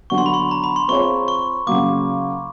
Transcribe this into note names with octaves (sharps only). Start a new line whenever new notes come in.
D3 F#3 B3 C#6
C6
B5
C6
A#5
B5
C6
C4 F4 G#4 C#5 C#6
C#6
C#3 F#3 A#3 D6